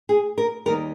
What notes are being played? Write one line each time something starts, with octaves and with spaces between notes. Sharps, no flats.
G#4
A#4
D#2 D#3 G3 A#4